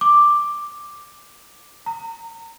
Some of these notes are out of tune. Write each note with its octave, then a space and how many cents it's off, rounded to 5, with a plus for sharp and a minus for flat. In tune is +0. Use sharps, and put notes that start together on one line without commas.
D6 +5
A#5 -30